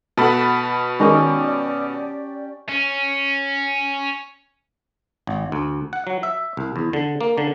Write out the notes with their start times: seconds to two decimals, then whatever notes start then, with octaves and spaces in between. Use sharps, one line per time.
0.17 B2 A3 A4 F#5 A5 B5
1.00 D#3 G#3 C#4 D#4 G4 D5
2.69 C#4
5.27 G#1
5.52 D2
5.93 F#5
6.07 F#3
6.23 E5
6.57 C2
6.76 E2
6.93 D3
7.21 A#3
7.38 D3